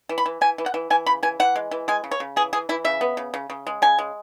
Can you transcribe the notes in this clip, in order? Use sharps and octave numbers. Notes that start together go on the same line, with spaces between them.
E3
B5
E3
E3 G#5
E3
F#5
E3
E3 G#5
C#3 B5
E3 G#5
E3 F#5
G#3
E3
G#3 G#5
C#3
C#5
C#3
E3 G#4
E3 G#4
E3 E4
C#3 E5
B3
C#3
C#3
C#3
G#3
C#3 G#5
G#3